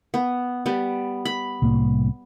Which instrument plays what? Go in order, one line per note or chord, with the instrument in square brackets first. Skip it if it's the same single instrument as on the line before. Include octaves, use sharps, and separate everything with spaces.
[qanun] B3
G3 B3
B5
[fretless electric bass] C2 A2 A#3